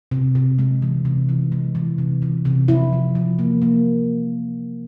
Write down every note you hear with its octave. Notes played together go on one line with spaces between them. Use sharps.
C3
C3
G#3
E3
C3
E3
G#3
E3
C3
E3
C3
F3 E4
F3
F3
A#3
A#3